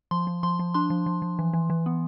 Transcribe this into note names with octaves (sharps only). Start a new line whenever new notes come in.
F3 C6
F3
F3 C6
F3
D4 C6
F3
F3
F3
E3
E3
E3
B3